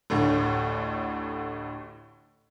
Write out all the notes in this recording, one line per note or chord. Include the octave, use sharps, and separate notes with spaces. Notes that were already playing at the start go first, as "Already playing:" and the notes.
A1 D2 A2 D3